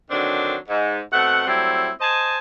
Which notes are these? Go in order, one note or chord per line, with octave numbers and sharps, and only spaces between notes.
D3 D#3 F#3 C4 D4
G#2
B2 A3 C4 F#5
F#3 G3 A3 C4 E4
C5 D#5 G#5 A5